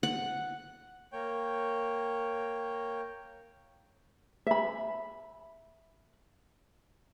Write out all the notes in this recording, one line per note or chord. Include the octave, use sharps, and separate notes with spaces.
F#5
A#3 C#5 G5
E5 B5